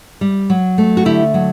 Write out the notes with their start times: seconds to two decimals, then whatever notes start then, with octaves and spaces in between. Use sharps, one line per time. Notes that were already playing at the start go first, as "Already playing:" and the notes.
0.21 G3
0.50 F#3
0.78 A3
0.97 F#4
1.05 D3 E4 G4
1.34 F#3